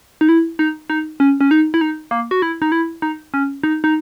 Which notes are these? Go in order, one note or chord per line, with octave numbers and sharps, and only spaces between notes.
D#4
E4
D#4
D#4
C#4
C#4
D#4
E4
D#4
A#3
F#4
E4
D#4
E4
D#4
C#4
D#4
D#4